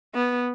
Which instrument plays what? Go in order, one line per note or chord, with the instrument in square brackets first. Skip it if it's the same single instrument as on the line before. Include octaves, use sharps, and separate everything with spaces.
[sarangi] B3